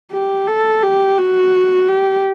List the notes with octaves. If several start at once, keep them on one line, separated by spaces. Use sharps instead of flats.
G4
A4
G4
F#4
G4